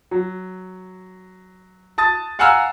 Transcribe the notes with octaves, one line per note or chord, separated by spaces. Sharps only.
F#3
A5 D#6 A6
F5 F#5 G#5 A#5 E6 F6